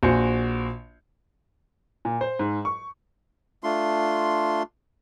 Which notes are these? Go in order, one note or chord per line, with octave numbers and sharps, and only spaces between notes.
A#1 F#4 C5 G#5 C#7
A#2
C5
G#2
C#6
A3 D4 F4 C6